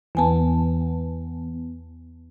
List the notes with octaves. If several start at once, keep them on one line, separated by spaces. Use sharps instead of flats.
E2 E3 B3 G#5 A5